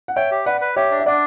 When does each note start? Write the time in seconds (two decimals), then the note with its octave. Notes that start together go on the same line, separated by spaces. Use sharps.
0.08 F#5
0.16 C#5 E5 G5
0.31 G4
0.46 B4 D5 F#5
0.61 B4
0.76 G4 C#5 E5
0.91 D4
0.99 E5
1.06 D4 D5 F#5